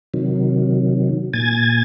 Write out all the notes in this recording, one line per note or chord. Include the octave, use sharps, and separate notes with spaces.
C3 D#3 F#3
A#2 G#5 G#6 A6